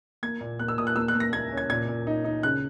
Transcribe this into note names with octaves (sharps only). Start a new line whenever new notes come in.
A#3 G#6
A#2
A#3 F#6
E6
A#2 D#6
F#6
A#3 E6
F#6
A#3
A#6
A#3 G#6
C#4
G#6
A#2 G#6
A#2
D#4
D#4
C#3 F#6